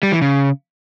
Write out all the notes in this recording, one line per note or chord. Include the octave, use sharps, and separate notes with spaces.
G3
E3
C#3